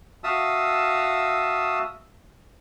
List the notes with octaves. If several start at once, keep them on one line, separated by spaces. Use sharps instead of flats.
F#4 E5 F5 A5 D#6 E6